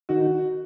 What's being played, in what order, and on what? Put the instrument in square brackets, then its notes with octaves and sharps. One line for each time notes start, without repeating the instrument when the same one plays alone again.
[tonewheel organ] D#3 D#4 [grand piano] F#4